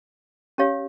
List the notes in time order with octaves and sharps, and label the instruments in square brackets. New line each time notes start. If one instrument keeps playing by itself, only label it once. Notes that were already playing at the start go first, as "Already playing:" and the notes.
[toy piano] C#4 G4 C#5 F5